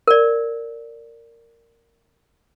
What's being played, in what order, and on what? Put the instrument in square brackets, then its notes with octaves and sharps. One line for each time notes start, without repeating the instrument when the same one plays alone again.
[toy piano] A#4 D5